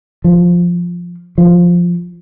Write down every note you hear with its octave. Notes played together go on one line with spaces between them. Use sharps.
F3
F3